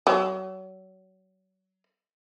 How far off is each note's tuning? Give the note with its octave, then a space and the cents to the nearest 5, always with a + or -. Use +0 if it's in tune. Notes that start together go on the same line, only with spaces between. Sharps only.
F#3 +30